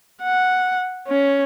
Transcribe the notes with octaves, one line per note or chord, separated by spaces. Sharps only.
F#5
C#4